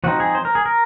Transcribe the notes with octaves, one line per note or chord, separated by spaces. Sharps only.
F3 C4 D#4 F#4
G#4
C5
A#4
G#4
A#4